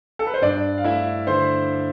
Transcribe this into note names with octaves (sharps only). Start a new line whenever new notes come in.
A4
B4
C5
G2 D4 D5
F5
A3 E4 E5
D3 C5 C6